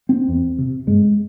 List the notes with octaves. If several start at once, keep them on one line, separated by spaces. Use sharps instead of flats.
C4
E2
C3
G2 G#3